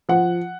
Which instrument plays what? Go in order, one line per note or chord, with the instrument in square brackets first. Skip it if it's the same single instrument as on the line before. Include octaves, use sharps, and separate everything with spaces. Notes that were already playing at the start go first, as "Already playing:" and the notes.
[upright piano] F3 F#5